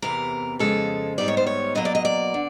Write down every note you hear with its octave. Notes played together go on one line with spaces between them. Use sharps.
E2 C3 E3 A#4
F2 C#3 F3 G#3 A4
G#2 D#3 G3 B3 D5
C#5
C5
C#5
E2 B2 F#3 A#3 D#5
D5
D#5
D5
D3